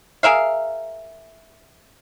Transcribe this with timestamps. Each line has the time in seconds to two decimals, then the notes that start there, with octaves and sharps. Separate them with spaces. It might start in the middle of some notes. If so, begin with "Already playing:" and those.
0.23 G#4 A#4 E5 F5